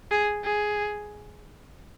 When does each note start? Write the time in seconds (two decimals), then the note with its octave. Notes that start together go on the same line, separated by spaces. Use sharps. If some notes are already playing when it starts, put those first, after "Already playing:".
0.11 G#4
0.44 G#4